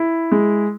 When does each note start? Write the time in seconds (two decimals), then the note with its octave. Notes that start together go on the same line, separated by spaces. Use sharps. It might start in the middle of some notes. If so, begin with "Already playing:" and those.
Already playing: E4
0.32 G#3